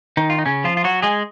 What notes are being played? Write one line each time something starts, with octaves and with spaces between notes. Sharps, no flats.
D#3 D#4
F4
D#4
C#3 C#4
F3 F4
F4
F#3 F#4
G#3 G#4